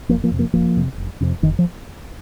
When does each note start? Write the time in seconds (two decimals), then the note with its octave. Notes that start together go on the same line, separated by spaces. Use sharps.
0.09 F1 F3 A#3
0.24 F3 A#3
0.31 F2 C3
0.39 F3 A#3
0.53 F1 F3 A#3
0.76 F2 C3
0.98 F1
1.21 F2 C3
1.42 F1 D#3
1.59 F3